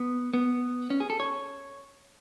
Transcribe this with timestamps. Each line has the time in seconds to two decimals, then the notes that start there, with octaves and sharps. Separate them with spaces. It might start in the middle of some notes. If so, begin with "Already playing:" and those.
Already playing: B3
0.34 B3
0.90 C#4
1.00 G#4
1.10 A4
1.20 C#5